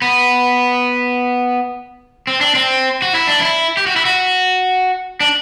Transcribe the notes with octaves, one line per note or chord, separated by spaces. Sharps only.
B3
C4
D4
C4
F#4
E4
D4
E4
G4
F#4
E4
F#4
D4